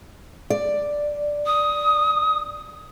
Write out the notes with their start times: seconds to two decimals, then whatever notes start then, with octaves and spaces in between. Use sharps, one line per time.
0.50 D5
1.46 D#6